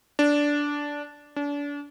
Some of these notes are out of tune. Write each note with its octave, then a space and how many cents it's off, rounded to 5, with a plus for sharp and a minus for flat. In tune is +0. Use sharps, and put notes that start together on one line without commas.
D4 -10
D4 -35